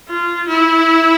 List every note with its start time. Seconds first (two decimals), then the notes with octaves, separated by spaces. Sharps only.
0.09 F4
0.48 E4